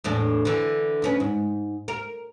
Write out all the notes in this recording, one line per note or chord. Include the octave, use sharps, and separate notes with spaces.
E2 A2 D4
D3 E3
D2 C#4 B4
G#2
A#4